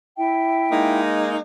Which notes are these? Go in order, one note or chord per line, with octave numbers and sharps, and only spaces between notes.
E4 E5 G5
G#3 A#3 D#4